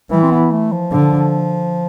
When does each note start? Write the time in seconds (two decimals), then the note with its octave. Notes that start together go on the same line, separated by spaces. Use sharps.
0.10 E3 G3
0.23 C4
0.31 B3
0.51 A3
0.72 F3
0.92 D3